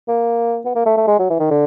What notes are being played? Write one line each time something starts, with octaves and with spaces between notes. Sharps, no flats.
A#3
B3
A#3
A3
A3
G#3
F#3
E3
D#3
D3